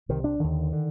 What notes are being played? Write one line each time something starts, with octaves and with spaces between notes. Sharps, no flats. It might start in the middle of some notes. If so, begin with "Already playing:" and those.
C2 C3 D#3
D4
D#2 D3 D#3
D3